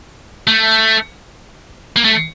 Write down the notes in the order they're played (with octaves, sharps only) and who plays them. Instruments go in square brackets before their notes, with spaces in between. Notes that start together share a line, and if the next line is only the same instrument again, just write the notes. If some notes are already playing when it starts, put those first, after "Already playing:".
[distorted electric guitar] A3
A#3
A3